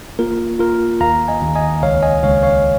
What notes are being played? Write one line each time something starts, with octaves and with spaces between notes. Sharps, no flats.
A#3 F4 A#4
A#3 F4 A#4
D#2 F5 A#5
D#5 G#5
D#2
D#5 G#5
C#2 C#5 F5
D#5 G#5
C#2 C#5 F5
C#5 F5